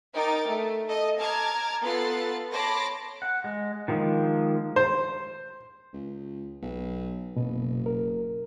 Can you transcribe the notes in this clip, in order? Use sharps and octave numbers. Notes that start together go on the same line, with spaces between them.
D#4 A#4 G5 D6 A6
A3
A4 D#5
A5 A#5 D6 F6 G#6
B3 F4 A4 F#6 A6 C7
C#5 A5 B5 C6 D6 A#6
F#5
G#3
D#3 F3 G#3 A#3
C5
C#2
B1
F#1 B2
A#4